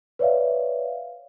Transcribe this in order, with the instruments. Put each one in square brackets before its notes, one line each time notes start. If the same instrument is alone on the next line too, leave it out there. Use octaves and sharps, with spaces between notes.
[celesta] B4 C#5 D5 E5 F5